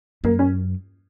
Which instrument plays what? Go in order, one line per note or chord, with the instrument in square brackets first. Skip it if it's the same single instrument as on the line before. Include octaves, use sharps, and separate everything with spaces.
[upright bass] F#2 [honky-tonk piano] A#3
[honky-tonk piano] C#4